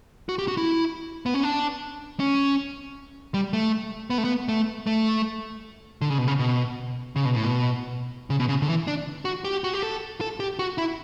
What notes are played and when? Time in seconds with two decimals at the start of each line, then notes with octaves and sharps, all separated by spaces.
0.29 F#4
0.39 G4
0.48 F#4
0.57 E4
1.26 B3
1.34 C#4
1.43 D4
2.20 C#4
3.34 G3
3.53 A3
4.10 B3
4.18 A3
4.24 B3
4.49 A3
4.87 A3
6.01 D3
6.10 C#3
6.18 B2
6.27 C#3
6.39 B2
7.16 C#3
7.25 B2
7.35 A2
7.44 B2
8.30 C#3
8.40 B2
8.49 C#3
8.62 D3
8.68 E3
8.87 D4
9.25 F#4
9.44 G4
9.64 F#4
9.73 G4
9.83 A4
10.21 A4
10.40 G4
10.59 F#4
10.78 E4